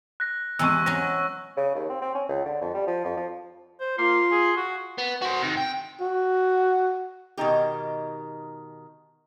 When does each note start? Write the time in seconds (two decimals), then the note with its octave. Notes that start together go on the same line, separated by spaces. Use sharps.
0.20 F#6 A#6
0.59 E2 C3 G#3 C#6 E6
0.86 F#3 C#4 A#6
1.57 C#3
1.75 D#2
1.90 C4
2.02 C4
2.15 C#4
2.29 C#2
2.45 D3
2.61 F2
2.74 G3
2.87 F3
3.05 F2
3.17 F3
3.80 C5
3.98 A#3 F4 C6
4.32 G#4
4.57 F#4
4.98 B3
5.22 F#4 C5
5.41 C3 D#3
5.57 G5
6.01 F#4
7.37 B2 D#3 D#4 G4